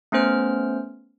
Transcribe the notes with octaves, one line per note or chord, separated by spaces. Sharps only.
A3 B3 C#4 C5 F6